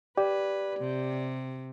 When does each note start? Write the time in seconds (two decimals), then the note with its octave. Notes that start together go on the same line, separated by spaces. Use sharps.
0.17 G4 B4 D5
0.79 C3